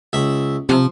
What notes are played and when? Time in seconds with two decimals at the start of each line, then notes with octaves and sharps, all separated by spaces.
0.13 C#2 E5
0.69 C3 F3